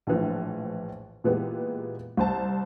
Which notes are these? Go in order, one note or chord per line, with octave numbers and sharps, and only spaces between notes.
A#1 A2 E3 F3
A#2 E3 G#3 B3 G4
C2 C5 A5